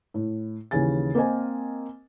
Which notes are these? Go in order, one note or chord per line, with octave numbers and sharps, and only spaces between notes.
A2
D#2 C#3 E3 G#5 A6
A#3 C4 A#4 C5 D#5 G#5